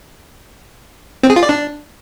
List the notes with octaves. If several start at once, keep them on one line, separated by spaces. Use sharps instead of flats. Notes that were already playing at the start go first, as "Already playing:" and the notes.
C4
G#4
F4
D5
D4